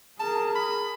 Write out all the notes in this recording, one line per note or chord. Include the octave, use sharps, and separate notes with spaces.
G#4 A#4 A5
B5